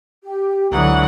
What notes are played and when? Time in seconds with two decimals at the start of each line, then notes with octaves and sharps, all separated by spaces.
0.23 G4
0.71 C#2 D3 E3 F#3 F#5 A#5 C#6 D#6